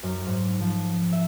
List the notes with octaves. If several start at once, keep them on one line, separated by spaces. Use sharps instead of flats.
F#2
G#2
F3
E5